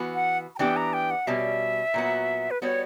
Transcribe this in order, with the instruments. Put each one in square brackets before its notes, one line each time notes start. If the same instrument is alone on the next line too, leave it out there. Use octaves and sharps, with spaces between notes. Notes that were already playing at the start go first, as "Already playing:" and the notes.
Already playing: [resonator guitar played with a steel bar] E3 B3 F#4
[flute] F#5
A#5
[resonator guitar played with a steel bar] E3 B3 D4 G4 [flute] G5
[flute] A#5
G5
F#5
[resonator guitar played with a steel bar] B2 G3 C#4 [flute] E5
[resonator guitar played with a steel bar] A#2 F#3 B3 F#4
[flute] B4
[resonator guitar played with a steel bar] G3 B3 F#4 [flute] C#5